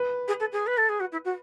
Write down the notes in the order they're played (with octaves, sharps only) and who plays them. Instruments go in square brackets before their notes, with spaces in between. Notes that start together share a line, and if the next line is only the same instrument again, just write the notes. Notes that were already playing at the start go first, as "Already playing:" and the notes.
Already playing: [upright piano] B4
[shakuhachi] G#4
A4
G#4
B4
A4
G#4
F#4
E4
F#4